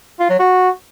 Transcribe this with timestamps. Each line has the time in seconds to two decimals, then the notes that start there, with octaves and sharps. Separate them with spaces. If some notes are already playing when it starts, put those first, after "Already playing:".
0.20 F4
0.29 F#3
0.39 F#4